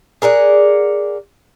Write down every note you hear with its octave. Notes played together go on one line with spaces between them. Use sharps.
G#4 A#4 D5 F#5